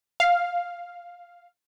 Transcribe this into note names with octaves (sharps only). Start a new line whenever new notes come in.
F5